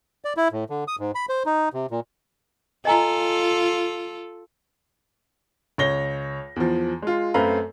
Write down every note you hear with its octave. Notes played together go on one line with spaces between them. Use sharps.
D5
E4
A2
D3
D#6
G#2
B5
C5
D#4
C3
A#2
F4 A4 D#5 G#5 A#5
C#2 C#5 A#6 G7
E2 F3
G#3 F4
F#2 A3 C4 B4 F5 A#5